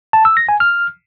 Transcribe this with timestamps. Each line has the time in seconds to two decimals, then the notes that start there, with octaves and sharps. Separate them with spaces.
0.13 A5
0.25 E6
0.37 A#6
0.49 G#5
0.60 F6